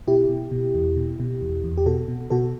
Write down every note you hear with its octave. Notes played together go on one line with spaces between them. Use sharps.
B2 E4 G4
B2
B2
E2
B2
B2
E2
E2
G4
B2 F#4 A4
B2
B2 F#4 A4